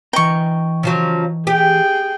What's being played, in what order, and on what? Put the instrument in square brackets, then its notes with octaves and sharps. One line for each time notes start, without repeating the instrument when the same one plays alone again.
[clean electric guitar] E3 D#5 A#5 [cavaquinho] G5 C#6
[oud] C#3 F3 F#3
[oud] G4 [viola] G#4 G5